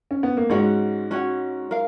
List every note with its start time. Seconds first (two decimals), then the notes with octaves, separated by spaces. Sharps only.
0.11 C#4
0.23 B3
0.37 A#3
0.50 G#2 G#3 C#4 F#4 C#5 F#5
1.11 C#4 F#4 C#5 F#5
1.71 A#4 F5